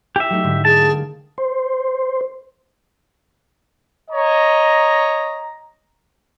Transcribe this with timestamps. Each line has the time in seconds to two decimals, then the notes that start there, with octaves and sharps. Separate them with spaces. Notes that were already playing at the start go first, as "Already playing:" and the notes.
0.16 E4 G4 E5
0.30 F#3 A3 D#4
0.44 G#2 D3
0.65 G#4 A5 D7
0.78 A#3 G4
1.38 C5
4.11 C#5 D#5 A#5